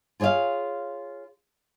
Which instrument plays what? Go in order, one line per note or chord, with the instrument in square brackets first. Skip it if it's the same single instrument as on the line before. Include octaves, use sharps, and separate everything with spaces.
[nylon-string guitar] F4 G#4 C#5 E5 F5